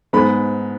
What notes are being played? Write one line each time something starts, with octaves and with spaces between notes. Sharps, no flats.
G#2 G#3 B3 B5